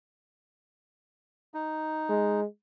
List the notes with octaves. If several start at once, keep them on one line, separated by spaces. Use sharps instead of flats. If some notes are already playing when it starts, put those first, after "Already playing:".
D#4
G#3